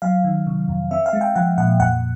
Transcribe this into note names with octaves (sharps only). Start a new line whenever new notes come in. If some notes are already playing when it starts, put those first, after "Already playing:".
F#3 F5
D#3
C3
F2
C4 E5
F5
G#3
G5
F3 F#5
A#2 F#5
F2 F#5